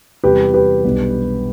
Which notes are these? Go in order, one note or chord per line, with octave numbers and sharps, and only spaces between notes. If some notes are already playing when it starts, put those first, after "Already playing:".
E2 C3 E3 G3 G4 B4
G4 B4
B1 B2 G3 B3 D4